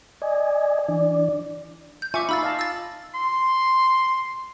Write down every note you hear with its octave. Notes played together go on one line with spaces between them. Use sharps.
D5 D#5 G#5
E3 D4 D5
G6
F4 E5 G#5 C#6 D6
D#4 F4 F5 B5 E6 A6
D#5 F5 A5
E6 A6
C6